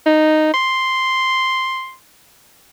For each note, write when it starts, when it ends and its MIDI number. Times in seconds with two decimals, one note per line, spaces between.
0.06 0.52 63
0.54 1.94 84